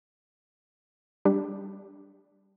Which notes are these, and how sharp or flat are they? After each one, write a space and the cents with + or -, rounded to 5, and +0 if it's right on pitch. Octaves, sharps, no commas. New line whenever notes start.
G3 +0 D4 +0 G4 +5